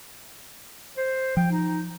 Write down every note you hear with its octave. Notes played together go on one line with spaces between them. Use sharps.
C5
F3 G5
D#4